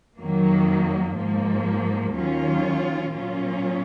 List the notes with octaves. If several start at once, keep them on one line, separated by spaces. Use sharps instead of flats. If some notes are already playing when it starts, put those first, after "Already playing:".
F2 D#3 F#3 A#3
G#2 F3 A#3
D#2 D#3 F#3 C#4 F4
A#2 F#3 C#4 F4